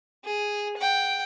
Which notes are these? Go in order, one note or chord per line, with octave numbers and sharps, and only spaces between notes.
G#4
F#5 G5